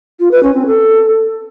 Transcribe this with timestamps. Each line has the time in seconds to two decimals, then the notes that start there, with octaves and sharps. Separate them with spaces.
0.20 F4
0.31 B4
0.43 C#4
0.55 C4
0.66 A4